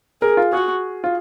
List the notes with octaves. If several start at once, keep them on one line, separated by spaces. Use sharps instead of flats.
G#4 A#4
F4
F#4 G#4
F4